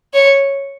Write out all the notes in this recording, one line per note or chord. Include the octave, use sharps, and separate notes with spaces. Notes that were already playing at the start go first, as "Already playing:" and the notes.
C#5